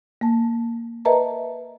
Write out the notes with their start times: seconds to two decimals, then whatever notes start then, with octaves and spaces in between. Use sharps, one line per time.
0.21 A#3 A5
1.05 A#4 B4 D#5 E5 A5 A#5